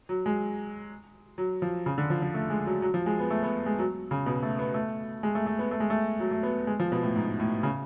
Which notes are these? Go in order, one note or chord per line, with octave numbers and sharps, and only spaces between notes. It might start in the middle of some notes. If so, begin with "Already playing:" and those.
F#3
G#3
F#3
F3
C#3
D3
F3
F3
A3
G#3
F#3
F#3
F3
G#3
B3
A3
B3
G#3
F#3
C#3
B2
A3
B3
A3
G#3
A3
A3
B3
A3
G#3
A3
F#3
A3
B3
G#3
F3
B2
A2
G#2
A2
C#3